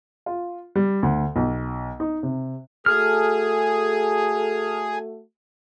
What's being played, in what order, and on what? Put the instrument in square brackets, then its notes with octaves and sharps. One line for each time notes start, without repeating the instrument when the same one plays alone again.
[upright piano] F4
G3
D2
B1
D#4
C3
[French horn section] A3 F#4 A4 [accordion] G#4 [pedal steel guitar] F6